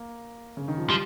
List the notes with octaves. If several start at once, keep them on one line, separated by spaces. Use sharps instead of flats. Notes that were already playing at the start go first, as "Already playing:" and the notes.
Already playing: A#3
C#3
D#3
F3
F3 G3